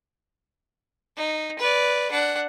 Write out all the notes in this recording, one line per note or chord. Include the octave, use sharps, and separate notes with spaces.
D#4
B4 D5
D4 F#5